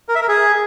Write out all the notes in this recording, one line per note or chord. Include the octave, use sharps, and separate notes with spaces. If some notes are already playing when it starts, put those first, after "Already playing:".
A#4
E5
A#4
G#4